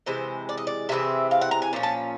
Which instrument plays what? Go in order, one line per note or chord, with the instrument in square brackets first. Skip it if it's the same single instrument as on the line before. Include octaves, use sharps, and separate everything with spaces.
[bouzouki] C3 E3 G#3 C5
D5
D#5
D5
C3 E3 G#3 C4 E5
F5
F#5
A#5
G#5
A#2 F3 C#4
A5